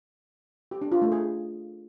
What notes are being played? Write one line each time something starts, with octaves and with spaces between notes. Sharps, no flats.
G4
D4
F4
A3
G#4